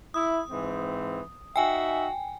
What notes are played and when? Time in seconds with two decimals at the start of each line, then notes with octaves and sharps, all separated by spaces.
0.14 E4 D#6
0.50 G#2 E3 C4
1.56 D#4 F#4 E5 G5 G#5